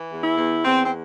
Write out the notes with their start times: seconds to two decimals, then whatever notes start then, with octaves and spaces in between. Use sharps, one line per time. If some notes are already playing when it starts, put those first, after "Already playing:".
Already playing: E3
0.10 E2
0.23 E4
0.37 E2
0.65 E2 C4
0.85 C4